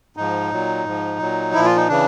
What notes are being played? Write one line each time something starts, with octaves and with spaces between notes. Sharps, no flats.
G#2 F3 D#4
A#2 F#3
G#2 F3
A#2 F#3
A#2 F3 E4
F4
D#4
C#3 E3 D4